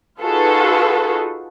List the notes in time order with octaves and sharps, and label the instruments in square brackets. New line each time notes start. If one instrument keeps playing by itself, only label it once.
[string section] D#4 F4 F#4 G#4 A4 B4